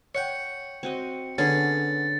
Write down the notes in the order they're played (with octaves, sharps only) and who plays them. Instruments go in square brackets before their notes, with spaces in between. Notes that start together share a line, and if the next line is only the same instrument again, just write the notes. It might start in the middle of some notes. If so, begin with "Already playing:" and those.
[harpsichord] C#5 F#5 G5 [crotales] C#7
[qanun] C4 F#4 D#5
[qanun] D3 G#4 [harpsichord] B3 C#4 [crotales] A6